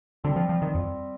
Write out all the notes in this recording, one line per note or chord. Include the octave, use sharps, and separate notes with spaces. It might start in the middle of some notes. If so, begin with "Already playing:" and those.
D3 G3 C4 G4
F3
F3
D#3
F2